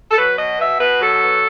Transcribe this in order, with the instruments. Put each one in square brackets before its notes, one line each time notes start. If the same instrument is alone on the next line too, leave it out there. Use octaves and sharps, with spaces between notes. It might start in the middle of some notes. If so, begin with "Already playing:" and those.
[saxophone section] A4
F#3 B4
B2 D#5
B3 E5
B2 B4
F#3 A4
B3